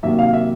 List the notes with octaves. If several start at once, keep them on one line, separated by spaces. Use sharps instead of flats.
C3 D#3 F#3 A#3 E5
F5
E5